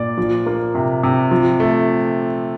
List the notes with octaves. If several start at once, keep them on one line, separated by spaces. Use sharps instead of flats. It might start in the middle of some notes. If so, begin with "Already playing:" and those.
Already playing: A#2 D5
F3
A#3
C3
C3
F3
A3